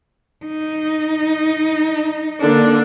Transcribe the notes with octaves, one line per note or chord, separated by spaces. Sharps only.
D#4
D3 A#3 D4